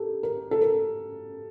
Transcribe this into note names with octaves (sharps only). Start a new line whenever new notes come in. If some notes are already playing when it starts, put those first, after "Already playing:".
Already playing: G4 A4 A#4
A#4
A4
A#4